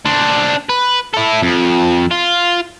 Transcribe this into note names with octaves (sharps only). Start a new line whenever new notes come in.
D4 C5
B4
E4 A4
F2
F4